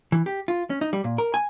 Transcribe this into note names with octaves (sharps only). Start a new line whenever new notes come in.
E3
G4
F4
C#4
D#4
G3
A#2
A#4
G#5